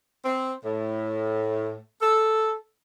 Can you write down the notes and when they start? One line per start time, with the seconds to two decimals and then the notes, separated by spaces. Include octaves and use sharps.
0.25 C4
0.64 A2
2.02 A4